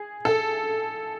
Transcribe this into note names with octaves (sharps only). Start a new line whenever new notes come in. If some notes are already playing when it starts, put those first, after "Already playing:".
Already playing: G#4
A4